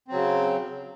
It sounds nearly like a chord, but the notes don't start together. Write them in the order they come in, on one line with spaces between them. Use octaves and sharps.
C4 F#3 C#3